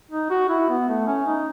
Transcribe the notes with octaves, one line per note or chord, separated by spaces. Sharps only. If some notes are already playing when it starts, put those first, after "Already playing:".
D#4
F#4
E4
B3
A3
C#4
D#4